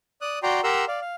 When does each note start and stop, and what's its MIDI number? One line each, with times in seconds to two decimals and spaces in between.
0.21 0.39 74
0.21 0.39 87
0.21 0.39 90
0.43 0.61 66
0.43 0.61 74
0.43 0.61 79
0.43 0.61 82
0.43 0.61 84
0.64 0.85 67
0.64 0.85 70
0.64 0.85 78
0.64 0.85 82
0.64 0.85 84
0.64 0.85 88
0.88 1.00 74
0.88 1.00 77
1.01 1.16 77